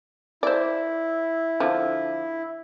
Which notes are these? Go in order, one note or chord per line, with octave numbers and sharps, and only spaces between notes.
E4 C5 D5
D3 F3